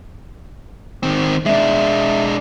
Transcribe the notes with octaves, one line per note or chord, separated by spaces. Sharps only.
D#3 C4
G#3 D4 E5